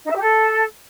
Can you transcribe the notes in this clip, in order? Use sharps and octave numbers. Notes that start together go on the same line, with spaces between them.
D#4
E5
G4
A4